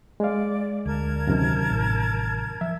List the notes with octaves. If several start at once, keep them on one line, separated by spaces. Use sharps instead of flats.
G#3 D5 F5
D2 A#4 A5 G#6
F#2 C3 D#3
A1
F3 E5